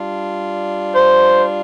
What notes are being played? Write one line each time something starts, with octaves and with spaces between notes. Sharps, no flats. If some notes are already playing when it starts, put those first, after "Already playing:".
Already playing: G3 D4 F4
C5